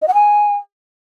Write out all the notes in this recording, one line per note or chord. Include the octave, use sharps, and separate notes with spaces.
D#5
F#5
G#5